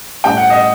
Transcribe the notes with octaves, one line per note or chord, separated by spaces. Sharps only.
A2 G3 G5
F#5
D#5